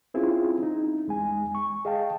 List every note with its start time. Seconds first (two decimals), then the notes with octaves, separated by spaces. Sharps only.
0.14 C4 C#4 E4 F4 G#4
0.63 D#4
1.07 E2 G#3 G#5
1.55 C#6
1.85 G#4 D#5 F5 G5 A5